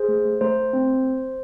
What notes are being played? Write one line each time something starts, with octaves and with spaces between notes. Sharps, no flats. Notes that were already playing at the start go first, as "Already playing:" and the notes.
Already playing: G#4 C5
A3
A3
A3 C5
A3
C4